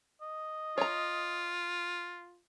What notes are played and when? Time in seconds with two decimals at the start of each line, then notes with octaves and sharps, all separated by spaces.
0.22 D#5
0.78 F4 C#5 A#5